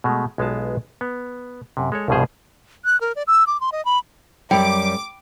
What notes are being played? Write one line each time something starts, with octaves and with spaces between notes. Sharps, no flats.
B2 G#3 A3
B1 G#3 B3 F4 A5
B3
F#2 C3
G#3 A4 C#5
C2 G2 B2 F3 G#4 C5
F#6
A#4
D5
E6
D6
C6
D#5
B5
F#2 G3 G5 B5 D6